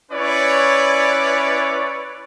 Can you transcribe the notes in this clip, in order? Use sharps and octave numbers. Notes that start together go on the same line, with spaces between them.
C#4 E4 B4 C#5 D5